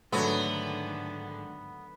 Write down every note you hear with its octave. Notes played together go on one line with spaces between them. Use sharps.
G#2 D3 D#3 F#3 A3 B3